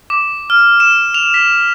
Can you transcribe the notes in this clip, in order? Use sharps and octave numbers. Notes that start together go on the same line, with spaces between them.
D6
F6
E7
F7
B6